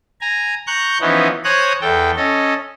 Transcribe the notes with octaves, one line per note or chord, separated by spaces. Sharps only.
G#5 A#5
A#5 C#6 F#6 G6
E3 F3 B3 C#4 D#4
C5 C#5 G#5 A#5 D#6 F#6
E2 A4 G5
C#4 A4 D#5